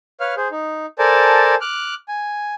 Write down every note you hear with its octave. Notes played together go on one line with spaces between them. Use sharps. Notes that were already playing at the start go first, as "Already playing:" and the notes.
B4 C#5 F5 F6
G#4 C5
D#4
A4 A#4 C5 D5 G#5 A5
D6 F6 F#6
G#5